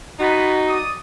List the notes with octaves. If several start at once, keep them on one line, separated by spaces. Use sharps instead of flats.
B3 D#4 F4 F#4 B4
D5 D#6